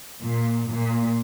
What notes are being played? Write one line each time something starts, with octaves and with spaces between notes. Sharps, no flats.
A#2
A#2